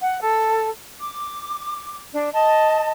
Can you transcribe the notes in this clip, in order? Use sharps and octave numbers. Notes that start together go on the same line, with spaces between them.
F#5
A4
D6
D4
D#5 A5